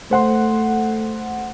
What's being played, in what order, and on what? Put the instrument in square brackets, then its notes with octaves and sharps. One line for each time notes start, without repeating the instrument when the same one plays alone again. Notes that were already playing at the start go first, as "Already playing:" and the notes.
[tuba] A3 [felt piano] C5 F#5 C6